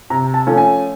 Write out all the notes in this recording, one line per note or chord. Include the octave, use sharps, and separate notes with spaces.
C3 A#5
A5
F3 A3 C#4
G#5